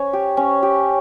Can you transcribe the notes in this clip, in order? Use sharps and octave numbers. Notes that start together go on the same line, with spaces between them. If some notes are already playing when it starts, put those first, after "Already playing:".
Already playing: C#4 C#5
G4
C#4
G4